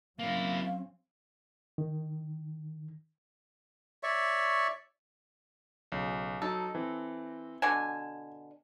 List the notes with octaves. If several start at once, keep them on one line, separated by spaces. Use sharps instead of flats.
F#3 A#3 C4 C#4 E4 F5
D#3
C#5 D5 E5 C#6
B1 C#3
F#3 D#4 A4 A5
E3 C4
B2 D3 G#5 E7